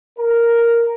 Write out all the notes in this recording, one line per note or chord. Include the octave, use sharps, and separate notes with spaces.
A#4